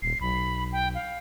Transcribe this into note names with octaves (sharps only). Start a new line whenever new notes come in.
D#1 C7
B1 B5
G5
F5